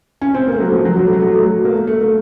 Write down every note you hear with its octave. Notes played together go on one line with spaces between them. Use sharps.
C#4
C4
A#3
A3
F#3
F3
F#3
F#3
A3
F#3
A3
F#3
A3
F#3
A#3
A3
A3
A#3